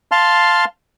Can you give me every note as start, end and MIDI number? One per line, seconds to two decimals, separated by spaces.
0.12 0.65 77
0.12 0.65 81
0.12 0.65 84
0.12 0.65 89